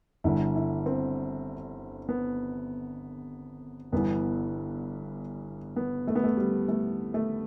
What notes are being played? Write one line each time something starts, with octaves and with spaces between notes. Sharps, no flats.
G1 G2 D3 E4
E4
C4
B3
G1 G2 E3 B3
B3
A3
B3
A3
G3
A3
A3